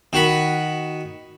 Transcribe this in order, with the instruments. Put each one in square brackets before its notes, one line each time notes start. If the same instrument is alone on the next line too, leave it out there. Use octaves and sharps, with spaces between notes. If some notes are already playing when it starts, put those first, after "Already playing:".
[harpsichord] D#3 F#4 B5